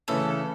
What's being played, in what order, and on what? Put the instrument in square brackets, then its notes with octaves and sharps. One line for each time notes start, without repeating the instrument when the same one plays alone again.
[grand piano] C#3 E3 A3 C#4 [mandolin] A4